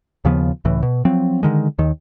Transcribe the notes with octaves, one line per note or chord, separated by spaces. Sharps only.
D#2 C#3 F3 B3
C#2 A2 E3
B2
F3 F#3 C4
D3 D#3 G#3
D#2 D#3